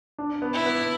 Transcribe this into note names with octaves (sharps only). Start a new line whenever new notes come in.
D4
B3
E4
B3